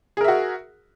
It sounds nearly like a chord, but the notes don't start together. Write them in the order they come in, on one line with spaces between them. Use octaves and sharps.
G#4 A#4 E5 F#4